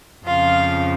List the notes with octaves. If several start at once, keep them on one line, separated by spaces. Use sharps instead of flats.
F2 C#3 F3 F4 F5